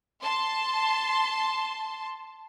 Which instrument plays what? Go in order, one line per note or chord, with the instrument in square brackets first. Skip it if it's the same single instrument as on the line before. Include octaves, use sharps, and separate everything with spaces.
[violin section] A5 C6